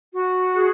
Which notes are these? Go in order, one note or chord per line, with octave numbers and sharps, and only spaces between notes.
F#4
G#4